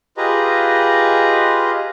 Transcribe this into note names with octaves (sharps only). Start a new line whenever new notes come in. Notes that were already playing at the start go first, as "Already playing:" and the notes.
F4 G4 G#4 B4 D#5 A#5